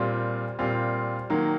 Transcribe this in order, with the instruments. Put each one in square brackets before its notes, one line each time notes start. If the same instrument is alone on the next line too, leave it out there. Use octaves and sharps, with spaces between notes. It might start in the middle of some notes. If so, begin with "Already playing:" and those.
Already playing: [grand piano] A#2 G3 C4 F4
A#2 G3 C4 F4
D#3 F#3 A#3